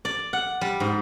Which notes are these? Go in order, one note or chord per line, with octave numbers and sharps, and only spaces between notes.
D5
F#5
G3
G#2